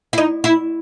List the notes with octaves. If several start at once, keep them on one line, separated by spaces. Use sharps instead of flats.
E4
D#4
E4